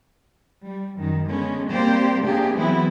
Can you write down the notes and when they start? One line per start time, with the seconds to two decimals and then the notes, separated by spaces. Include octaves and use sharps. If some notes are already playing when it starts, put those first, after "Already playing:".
0.65 G3
0.98 F#2 D#3
1.28 D3 G#3 B3 C#4
1.71 G3 A#3 C4 G4 C5 D5
2.23 C3 A3 A#3 D4 G4 G#4
2.56 E3 F#3 B3 C4 E4